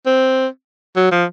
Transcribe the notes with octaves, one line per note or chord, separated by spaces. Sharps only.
C4
F#3
F3